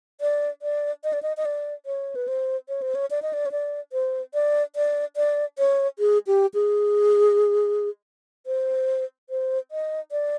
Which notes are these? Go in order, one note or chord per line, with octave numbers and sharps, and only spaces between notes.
D5
D5
D#5
D5
D#5
D#5
D5
C#5
B4
C5
C#5
C5
C#5
D5
D#5
D5
C#5
D5
C5
D5
D5
D5
C#5
G#4
G4
G#4
C5
C5
D#5
D5